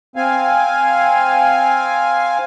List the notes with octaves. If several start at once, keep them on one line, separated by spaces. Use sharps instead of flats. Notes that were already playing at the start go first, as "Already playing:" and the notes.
C4 F5 G#5